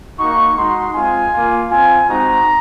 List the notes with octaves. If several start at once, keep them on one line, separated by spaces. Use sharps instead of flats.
A#3 D#4 F#4 C#6
G#3 D#4 F#4 C6
G#3 C4 F4 G#5
A#3 F4
C4 F4 G#5
G#3 C4 D#4 F#4 A#5